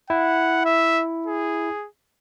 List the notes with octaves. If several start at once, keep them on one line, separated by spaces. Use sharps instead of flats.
E4 F#5
E5
G#4